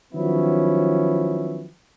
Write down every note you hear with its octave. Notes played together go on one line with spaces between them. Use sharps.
D#3 F3 F#3 B3 C#4 E4